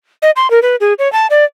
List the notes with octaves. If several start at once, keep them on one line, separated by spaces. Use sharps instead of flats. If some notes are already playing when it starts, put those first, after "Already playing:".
D#5
C6
A#4
B4
G#4
C#5
A5
D5